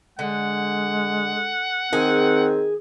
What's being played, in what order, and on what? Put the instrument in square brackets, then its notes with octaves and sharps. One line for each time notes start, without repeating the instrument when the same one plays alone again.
[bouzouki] D3 [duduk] G#3 [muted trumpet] F#5
[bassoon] D#3 [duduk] C4 [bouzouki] G#4